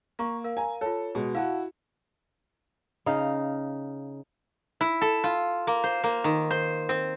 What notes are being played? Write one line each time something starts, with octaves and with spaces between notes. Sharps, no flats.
A#3 F5 A#5 C#6
A#4 F5
G#5 A#5
F4 A4 C#5
B2 G#3
E4 F#4 F5 A5
C#3 D#4 F5
E4
A4
F4
A#3
C5
A#3
D#3
C5
C4